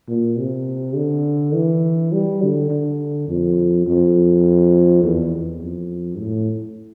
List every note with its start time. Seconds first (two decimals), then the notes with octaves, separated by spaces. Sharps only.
0.08 A#2
0.38 C3
0.96 D3
1.54 E3
2.12 G3
2.42 D3
2.70 D3
3.28 F2
3.87 F2
5.03 E2
5.62 F2
6.19 A2